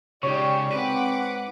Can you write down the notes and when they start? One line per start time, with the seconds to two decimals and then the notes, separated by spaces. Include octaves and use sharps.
0.23 G#2 C#3 G4 C#5 D5
0.72 C4 B4 F#5 D6